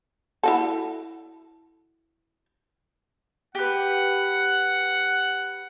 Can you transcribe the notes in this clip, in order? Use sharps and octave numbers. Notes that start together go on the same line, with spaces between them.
E4 F#4 A4
G4 B4 F#5